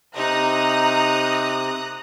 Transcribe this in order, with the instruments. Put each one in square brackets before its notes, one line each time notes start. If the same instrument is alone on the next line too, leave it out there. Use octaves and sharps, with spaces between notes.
[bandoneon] C3 [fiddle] D#4 [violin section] A#5 D#6 F#6